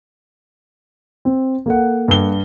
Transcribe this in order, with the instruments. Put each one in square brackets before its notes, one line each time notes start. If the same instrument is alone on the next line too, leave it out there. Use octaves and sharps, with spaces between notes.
[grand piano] C4
A#3 A4 F#5
[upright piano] G2 G7